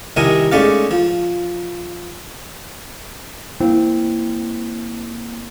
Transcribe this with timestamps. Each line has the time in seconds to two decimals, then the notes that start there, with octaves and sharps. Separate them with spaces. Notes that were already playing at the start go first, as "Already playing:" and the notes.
0.16 C2 C3 D#3 A#4 G#5 D#6
0.52 G#2 A3 C#4 D5 F5
0.91 F3
3.60 A#3 C4 E4